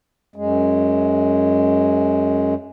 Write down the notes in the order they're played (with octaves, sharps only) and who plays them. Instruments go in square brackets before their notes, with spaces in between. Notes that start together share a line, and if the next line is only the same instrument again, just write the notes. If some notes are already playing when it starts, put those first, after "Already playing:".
[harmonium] F#2 G#3